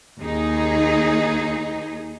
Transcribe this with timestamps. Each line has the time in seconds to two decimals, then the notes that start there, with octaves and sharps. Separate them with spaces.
0.20 D#2 D#4 G#4